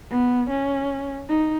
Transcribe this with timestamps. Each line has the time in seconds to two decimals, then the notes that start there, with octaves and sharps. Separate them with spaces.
0.10 B3
0.50 C#4
1.29 D#4